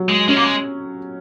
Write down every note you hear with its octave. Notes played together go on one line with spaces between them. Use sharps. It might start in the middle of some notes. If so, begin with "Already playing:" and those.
Already playing: F#3
G#3
G#3 C#4
A#3
G#3